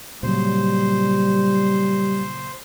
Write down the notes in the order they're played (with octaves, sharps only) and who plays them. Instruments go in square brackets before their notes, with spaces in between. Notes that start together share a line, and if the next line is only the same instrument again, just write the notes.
[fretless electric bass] A#2 C#3 F#3 [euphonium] G3 [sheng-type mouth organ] C5